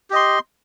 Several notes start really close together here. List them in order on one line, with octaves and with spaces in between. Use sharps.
G4 D#5 C6